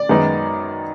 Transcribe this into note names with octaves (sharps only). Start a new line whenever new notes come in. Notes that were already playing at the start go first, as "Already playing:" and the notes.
Already playing: D5
F#2 D#3 G#3 B3 D#4